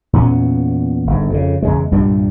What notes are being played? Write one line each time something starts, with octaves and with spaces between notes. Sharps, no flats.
E2 A#2 B3 C#4
G1 G#2
F2 C#3
E2 C#3 G#3
C2 G2 A#2 G3